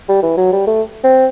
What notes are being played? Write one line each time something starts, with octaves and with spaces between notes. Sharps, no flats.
G3
E3
F#3
G3
A3
C4